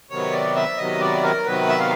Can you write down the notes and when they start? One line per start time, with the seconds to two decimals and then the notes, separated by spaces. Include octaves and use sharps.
0.10 C3 D#3 F#3 B3 C#5
0.32 D5
0.56 E5
0.78 C3 D#3 F#3 B3 D#5
1.00 D5
1.23 A#4
1.46 C3 D#3 F#3 B3 B4
1.68 E5
1.79 F5